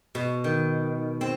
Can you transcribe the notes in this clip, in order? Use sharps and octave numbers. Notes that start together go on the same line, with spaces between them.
B2
D#3
C4